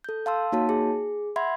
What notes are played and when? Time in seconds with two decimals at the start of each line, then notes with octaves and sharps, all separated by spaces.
0.04 A4 G6
0.26 F5 A5 C6 E6
0.52 A#3 D#4 F#4 C#5 A5
0.69 G#4
1.36 E5 F#5 B5 C6 G#6